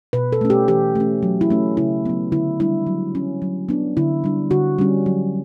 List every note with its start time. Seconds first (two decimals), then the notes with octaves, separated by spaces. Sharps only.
0.13 B2 B4
0.32 A4
0.41 A3 C#4
0.50 G4
0.68 E3 G4
0.96 A3 C#4
1.23 F#3
1.41 E4
1.50 A3 C#4
1.77 C#3 E4
2.05 F#3 B3
2.32 D3 E4
2.60 G3 D4 E4
2.87 F#3
3.15 C#4
3.42 F#3
3.69 B3 D4
3.97 D3 E4
4.24 G3 D4
4.51 D3 F#4
4.79 G3 C#4
5.06 F#3